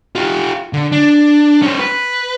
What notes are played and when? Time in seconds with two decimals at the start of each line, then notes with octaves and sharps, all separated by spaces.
0.16 F4 G4
0.73 D3
0.92 D4
1.62 C#4 C5
1.79 B4